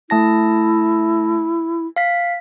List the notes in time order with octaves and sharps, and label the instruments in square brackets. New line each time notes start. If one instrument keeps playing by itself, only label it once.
[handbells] A3 A5 A#6 [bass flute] E4
[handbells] F5 B6